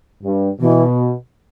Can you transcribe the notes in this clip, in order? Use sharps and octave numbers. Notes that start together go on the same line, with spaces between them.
G2
B2 E3